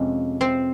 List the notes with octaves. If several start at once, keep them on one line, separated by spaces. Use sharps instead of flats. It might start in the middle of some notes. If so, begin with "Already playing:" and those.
Already playing: F2 C3 G#3 C#4
C4 C5